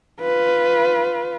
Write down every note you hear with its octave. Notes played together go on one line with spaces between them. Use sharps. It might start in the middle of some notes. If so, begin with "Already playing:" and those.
F4 B4